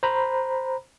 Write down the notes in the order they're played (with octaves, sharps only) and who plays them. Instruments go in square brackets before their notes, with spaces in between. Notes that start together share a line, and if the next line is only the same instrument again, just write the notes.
[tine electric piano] C5 A#5 B5